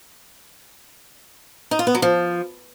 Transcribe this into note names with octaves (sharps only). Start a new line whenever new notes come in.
D#4
F4
B3
F#3
F3